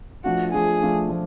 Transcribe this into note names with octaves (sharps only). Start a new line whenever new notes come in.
F3 A3 D4 F4 F#4
F3 A3 D4 F4 G#4
F3 A3 D4 F4
F3 A3